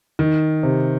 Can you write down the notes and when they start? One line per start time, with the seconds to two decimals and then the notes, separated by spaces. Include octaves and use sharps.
0.19 D#3
0.63 C3